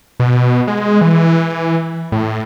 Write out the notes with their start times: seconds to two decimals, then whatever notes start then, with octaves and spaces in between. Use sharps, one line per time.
0.20 B2
0.68 G#3
1.01 E3
2.12 A2